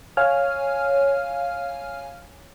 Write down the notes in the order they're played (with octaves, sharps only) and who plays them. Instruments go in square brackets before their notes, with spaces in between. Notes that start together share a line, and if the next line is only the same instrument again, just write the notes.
[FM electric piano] C#5 F5 G#5 F6